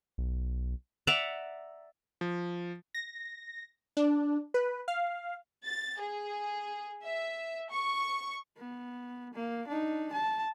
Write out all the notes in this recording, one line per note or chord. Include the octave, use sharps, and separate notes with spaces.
B1
D5 E5 F#5 A#5
F3
A#6
D4
B4
F5
A6
G#4
E5
C#6
B3
A#3
D4 D#4
A5